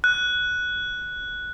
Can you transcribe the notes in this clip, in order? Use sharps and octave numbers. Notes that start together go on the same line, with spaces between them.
F#6